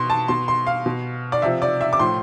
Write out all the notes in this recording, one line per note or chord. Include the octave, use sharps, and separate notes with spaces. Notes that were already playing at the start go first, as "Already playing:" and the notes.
Already playing: B2 C6
A5
B2 C6
C6
F5
B2
D5
C3 F3 E5
D5
E5
D6
A2 F3 C6